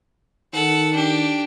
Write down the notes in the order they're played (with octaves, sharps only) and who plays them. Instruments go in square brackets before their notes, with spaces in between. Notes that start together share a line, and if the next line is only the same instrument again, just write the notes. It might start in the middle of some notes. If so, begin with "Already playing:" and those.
[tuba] D#3 [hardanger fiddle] A4 F#5
[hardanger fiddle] D4 G4